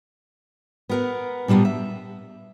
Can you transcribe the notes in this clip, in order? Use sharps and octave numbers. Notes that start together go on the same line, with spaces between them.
B3 A#4 F#5
A#2 G3 A#3 B3 D4
E5